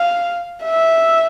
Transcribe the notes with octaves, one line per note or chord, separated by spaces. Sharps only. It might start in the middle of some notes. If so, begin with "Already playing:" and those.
Already playing: F5
E5